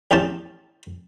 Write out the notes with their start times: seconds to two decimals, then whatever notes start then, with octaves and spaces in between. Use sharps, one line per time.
0.11 A1 E2 C#4 G4 A5